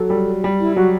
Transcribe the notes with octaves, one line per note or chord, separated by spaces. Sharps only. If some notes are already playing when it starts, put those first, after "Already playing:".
Already playing: F#3 A4
G3
G3
E4
F#3 F#4